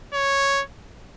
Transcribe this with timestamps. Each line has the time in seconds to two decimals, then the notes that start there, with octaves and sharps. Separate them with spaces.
0.13 C#5